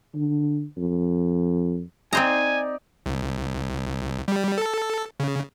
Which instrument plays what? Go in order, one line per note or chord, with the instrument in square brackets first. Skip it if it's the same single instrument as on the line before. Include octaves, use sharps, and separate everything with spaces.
[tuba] D3
F2
[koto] C4 C5 A#5 [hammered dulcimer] D#4 D5 [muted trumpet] G#5
[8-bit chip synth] C2
G3
A4
C#3